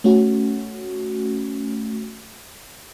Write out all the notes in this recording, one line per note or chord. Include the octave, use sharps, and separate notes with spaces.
A3 C#4 F#4